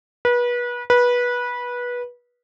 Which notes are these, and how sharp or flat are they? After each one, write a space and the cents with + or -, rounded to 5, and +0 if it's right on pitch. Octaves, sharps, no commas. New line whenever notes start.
B4 -30
B4 -20